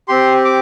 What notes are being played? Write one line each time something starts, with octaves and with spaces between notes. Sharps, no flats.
C4 G4 C6
D6